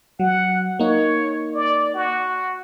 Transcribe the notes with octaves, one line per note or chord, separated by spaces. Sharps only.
F#3 F#5
A#3 D#4 C#5
D5
F#4